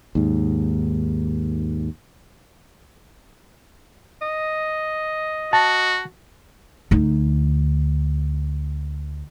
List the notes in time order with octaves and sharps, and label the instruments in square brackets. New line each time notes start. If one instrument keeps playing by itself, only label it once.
[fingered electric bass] D#2 G#2
[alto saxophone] D#5
[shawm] F#4 [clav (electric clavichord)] A5
[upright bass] D2 D#4